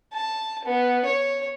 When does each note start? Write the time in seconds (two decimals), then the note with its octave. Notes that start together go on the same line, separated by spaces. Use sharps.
0.13 A5
0.65 B3
1.05 C#5